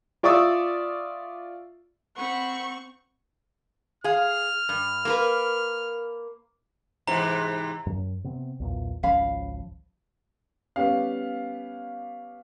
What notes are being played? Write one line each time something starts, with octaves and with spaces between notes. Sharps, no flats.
F4 D5 E5 C#6 D#6 E6
C4 F#5 B5 C#6
G#4 F5 F6
G2
A#3 A#4 B4
G#2 C3 E3 A#5
F#2
C3 B3 C4
B1 E2 A#2
G#1 C#2 F3 C#4 F5 B5
G3 B3 C#4 G4 F5